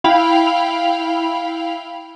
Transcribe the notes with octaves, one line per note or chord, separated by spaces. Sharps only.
E4 F5 G5 B5 F7